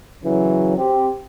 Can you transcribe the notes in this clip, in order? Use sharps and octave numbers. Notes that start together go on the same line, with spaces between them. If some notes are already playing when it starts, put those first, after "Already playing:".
C#3 E3 F#3
C4 G4